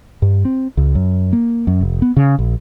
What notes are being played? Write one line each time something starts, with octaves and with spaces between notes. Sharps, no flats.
G2
C4
C#2
F#2
A#3
F#2
F1
B3
C#3
A#1